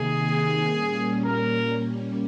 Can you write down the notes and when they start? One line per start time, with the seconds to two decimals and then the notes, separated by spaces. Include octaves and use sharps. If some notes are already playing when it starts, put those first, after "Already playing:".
Already playing: C3 D#3 A#3 D#4 G#4
0.66 A#2 G3 A#3 C#4
1.25 A#4